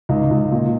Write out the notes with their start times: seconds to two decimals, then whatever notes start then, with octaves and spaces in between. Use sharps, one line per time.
0.09 C#2 D#4
0.31 C#2
0.52 A#2